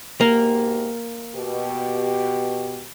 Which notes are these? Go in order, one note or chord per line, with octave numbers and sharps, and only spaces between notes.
G#2 B2 A#3 G4
B2 G4